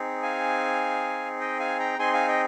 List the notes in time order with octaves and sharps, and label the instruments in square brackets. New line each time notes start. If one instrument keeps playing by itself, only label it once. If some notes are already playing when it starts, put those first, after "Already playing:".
Already playing: [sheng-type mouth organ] C4 D#4 G#4
F5 G#5
D#5 G5
F5 G#5
G5 A#5
C4 D#4 G#4 G#5 C6
F5 G#5
D#5 G5